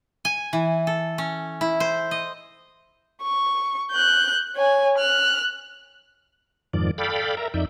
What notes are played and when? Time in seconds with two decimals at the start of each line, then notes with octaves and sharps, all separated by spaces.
0.25 G#5
0.53 E3
0.87 A4
1.18 C#4
1.61 E4
1.80 C5
2.11 D#5
3.22 C#6
3.92 F#6 G6
4.56 C#5 G#5
4.98 F6 F#6
6.73 F2 G#2 D#3 F3 D5
6.98 A4 D5 F5 G5 B5
7.37 A#4 E5 A#5
7.54 F2 D#4 D5 E5 G6